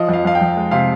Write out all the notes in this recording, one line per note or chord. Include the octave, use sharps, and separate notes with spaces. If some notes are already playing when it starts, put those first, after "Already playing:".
Already playing: F3 D#5
F2 F5
F2 F5
G5
F2
G#3
C3 F5